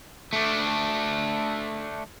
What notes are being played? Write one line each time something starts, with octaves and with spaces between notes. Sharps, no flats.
A3 D4